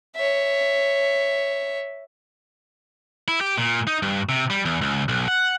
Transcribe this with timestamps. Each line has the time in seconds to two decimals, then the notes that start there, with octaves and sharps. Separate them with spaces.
0.16 C#5 E5
3.28 E4
3.41 G4
3.58 A#2
3.87 D#4
4.02 G2
4.29 C3
4.50 G3
4.65 E2
4.81 C#2
5.09 B1
5.28 F#5